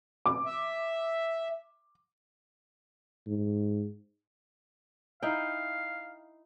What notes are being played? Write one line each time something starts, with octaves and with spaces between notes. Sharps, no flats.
D6
E5
G#2
D#4 E4 F5 G5